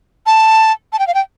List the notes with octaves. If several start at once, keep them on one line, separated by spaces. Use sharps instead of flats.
A5
A5
G5
F5
G5